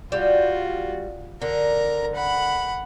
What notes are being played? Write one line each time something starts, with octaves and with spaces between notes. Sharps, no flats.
G3 F4 F#4
D3 A#4 A#5
F#5 B5